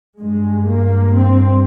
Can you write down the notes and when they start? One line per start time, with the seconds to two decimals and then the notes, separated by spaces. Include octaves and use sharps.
0.21 G2 G#3
0.69 A#3
1.16 C4